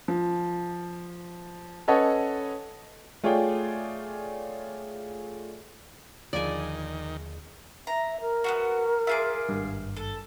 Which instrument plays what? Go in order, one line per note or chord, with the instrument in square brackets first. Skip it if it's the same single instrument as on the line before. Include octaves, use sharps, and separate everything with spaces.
[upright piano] F3
C#4 A4 B4 C#5 D#5 F#5
[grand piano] A3 F4 G#4 C#5 D5 G5
[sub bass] D#2 [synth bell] D3 F3 G#4 [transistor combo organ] D#3 [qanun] D5 G#5
[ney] E5 [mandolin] A#5
[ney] A#4
[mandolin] B3 F4 F#4
[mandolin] F4 G#4 D6 [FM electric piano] E5
[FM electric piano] G#1 G2
[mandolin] A4